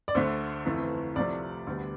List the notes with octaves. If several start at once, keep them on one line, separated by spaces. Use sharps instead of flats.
D5
D2 D3 A3 C5
G1 F2 E3 A3
C2 C3 F3 A3 D5
D2 D3 G3 B3